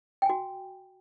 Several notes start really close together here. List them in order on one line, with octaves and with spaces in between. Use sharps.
G5 G#5 F#4